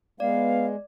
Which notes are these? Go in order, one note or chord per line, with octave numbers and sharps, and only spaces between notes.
G#3 B3 D5 F5